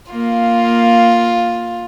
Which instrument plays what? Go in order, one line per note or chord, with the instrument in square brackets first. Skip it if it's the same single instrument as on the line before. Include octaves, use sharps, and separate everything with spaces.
[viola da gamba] A#3 [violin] F4